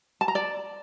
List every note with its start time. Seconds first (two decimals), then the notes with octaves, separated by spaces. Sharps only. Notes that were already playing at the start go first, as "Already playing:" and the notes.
0.21 A5
0.28 A#5
0.35 D5